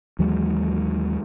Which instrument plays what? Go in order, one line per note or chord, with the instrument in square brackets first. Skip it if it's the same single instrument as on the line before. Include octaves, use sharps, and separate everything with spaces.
[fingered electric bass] D#2 E3 F#3 G#3